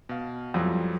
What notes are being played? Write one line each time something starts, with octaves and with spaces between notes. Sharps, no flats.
B2 F5
F2 E3 F#3 G3